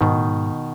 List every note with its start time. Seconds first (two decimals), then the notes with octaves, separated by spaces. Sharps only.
0.01 G#2 B2 D#3
0.15 A2
0.28 G#2